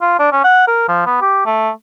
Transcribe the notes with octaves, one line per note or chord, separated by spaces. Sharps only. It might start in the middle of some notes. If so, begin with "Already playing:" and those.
F4
D4
C#4
F#5
A#4
F3
B3
G4
A3